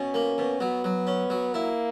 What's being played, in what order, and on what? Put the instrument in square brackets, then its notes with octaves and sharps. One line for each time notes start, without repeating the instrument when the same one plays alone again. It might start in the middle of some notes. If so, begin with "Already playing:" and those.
Already playing: [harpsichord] B2 [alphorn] C#4
[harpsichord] A#3
B2
[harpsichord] F#3 [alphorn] B3
[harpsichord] F#3
C#4
F#3
[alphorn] A#3 [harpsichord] E4